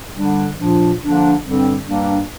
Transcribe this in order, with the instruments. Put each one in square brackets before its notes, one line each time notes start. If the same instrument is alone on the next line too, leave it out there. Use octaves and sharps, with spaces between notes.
[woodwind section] D3 G3 D4
A#2 F3 D4
D3 F3 A#3 D4
G2 D3 G3 C4
G2 G3 A#3 D4